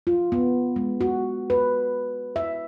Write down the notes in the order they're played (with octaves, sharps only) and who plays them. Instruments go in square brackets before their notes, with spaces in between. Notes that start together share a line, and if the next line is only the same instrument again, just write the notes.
[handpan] F4
B3
G#3
F#4
B4
E5